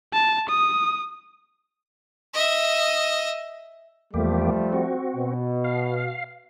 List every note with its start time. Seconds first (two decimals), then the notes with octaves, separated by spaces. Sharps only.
0.14 A5
0.50 D#6
2.34 D#5 E5
4.14 E2 F3 G3 A3 A#3 G4
4.73 C4 F#4
5.16 B2
5.64 F5